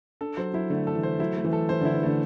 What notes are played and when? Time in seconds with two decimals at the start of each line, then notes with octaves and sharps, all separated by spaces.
0.21 D4 A4
0.37 F#3 C5
0.54 F#3 E4
0.70 D3 A3
0.87 A4
0.95 E3
1.03 C5
1.19 F#3 E4
1.37 A3
1.44 E3
1.53 A4
1.69 E3 C5
1.81 D3 E4
1.94 E3
2.03 D3 A3